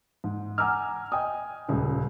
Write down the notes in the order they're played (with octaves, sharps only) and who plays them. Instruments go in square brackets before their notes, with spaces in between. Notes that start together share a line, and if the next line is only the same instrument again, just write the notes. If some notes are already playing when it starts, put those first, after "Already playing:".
[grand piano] G#2
F#5 G#5 A#5 D6 E6 F6
D#5 G5 G#5 D#6
D#1 C#2 C#3